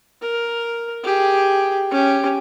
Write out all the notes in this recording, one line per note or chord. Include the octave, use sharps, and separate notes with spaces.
A#4
G4 G#4
C#4 G4